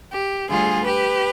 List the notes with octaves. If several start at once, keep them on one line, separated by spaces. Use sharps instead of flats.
G4
D2 D3 G3 F4 G#4
G4 B4